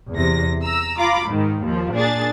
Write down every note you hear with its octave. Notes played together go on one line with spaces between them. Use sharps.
E2 C3 A#6
A#5 E6
F4 A#5 B5 D6
G#2 D#3
D#2 F3
A#2 D4 G#4 A6